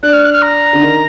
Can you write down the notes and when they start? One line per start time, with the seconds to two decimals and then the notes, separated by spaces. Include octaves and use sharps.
0.03 D4 F#6
0.13 F6
0.24 F#6
0.33 F6
0.42 A#5
0.73 D3
0.82 D#3